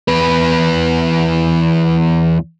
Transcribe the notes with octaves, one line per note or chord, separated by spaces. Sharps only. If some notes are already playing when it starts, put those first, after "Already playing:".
E2 B4